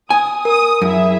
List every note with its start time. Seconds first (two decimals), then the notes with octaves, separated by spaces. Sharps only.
0.10 G#5 D#6
0.45 A#4 D#6
0.82 F#2 E4 G#4 E5